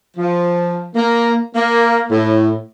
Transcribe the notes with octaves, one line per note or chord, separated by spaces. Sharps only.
F3
A#3
A#3
A2